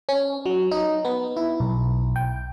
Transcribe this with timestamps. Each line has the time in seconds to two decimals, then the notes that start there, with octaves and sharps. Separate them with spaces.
0.09 C#4
0.46 F#3
0.71 D#4
1.05 B3
1.37 E4
1.60 B1
2.16 G5